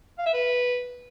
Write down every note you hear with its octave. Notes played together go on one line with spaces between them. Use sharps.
F5
E5
B4